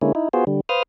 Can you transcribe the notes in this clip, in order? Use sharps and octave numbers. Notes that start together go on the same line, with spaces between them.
D3 G#3 A#3 C#4 E4
D#4 E4
B3 F4 F#4 G#4 C5
D3 G3
B4 C5 F5 D#6 F6